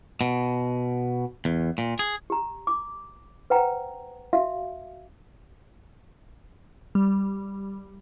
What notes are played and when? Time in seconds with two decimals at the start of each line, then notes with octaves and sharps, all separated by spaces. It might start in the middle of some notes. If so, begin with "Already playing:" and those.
0.21 B2
1.45 E2
1.78 A#2
1.99 G#4
2.30 G4 A#5
2.67 D6
3.50 B4 C5 F#5 G5 A#5
4.33 F#4 E5 F5
6.95 G3